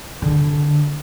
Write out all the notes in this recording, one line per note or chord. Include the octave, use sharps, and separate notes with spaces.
D3